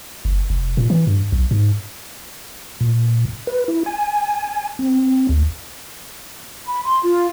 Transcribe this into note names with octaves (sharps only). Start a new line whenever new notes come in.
F#1
F1
A#2
E3
G2
B1
G#2
A#2
B4
E4
G#5
C4
D2
B5
C6
F4